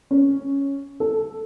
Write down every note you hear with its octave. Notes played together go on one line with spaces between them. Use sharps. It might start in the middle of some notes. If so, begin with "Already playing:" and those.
C#4
A4